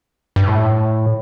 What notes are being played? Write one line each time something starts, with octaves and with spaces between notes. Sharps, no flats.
G2
A2